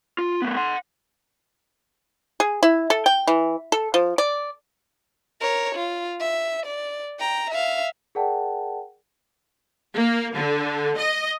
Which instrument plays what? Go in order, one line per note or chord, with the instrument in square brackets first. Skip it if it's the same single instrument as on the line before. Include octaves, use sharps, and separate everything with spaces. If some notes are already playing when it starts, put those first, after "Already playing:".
[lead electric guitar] F4
A3 B3
F#5 C6
[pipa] G#4
E4
A4
G5
E3
A4
F3
D5
[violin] A#4 C#5
F4
E5
D5
G5 A#5
E5 F5
[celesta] G#4 A#4 D5 F#5 G5 A5
[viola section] A#3
D3
D#5